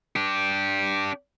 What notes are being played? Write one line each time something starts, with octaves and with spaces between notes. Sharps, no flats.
D4 G4